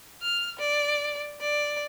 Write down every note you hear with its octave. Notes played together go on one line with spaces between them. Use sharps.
F6
D5
D5